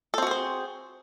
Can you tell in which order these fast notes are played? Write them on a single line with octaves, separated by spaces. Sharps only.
A4 C4 F#4 G#4 C5